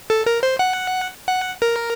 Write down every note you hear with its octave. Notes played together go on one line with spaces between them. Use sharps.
A4
A#4
C5
F#5
F#5
A#4